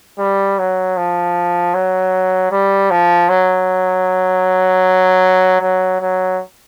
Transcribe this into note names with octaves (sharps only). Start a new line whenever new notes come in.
G3
F#3
F3
F#3
G3
F3
F#3
F#3
F#3